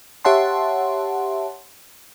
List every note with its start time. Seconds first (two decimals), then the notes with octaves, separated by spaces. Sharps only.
0.25 G4 C#5 E5 F#5 A5 C6